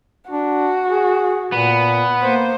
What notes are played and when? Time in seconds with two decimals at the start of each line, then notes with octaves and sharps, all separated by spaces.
0.31 D4 F#4
0.88 G#4
1.52 A#2 B3
2.23 A#3 C5